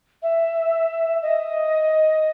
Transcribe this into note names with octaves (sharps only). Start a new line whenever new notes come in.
E5
D#5